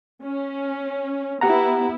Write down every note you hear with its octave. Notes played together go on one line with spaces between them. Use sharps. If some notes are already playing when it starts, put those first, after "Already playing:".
C#4
B3 E4 G4 F#5 A#5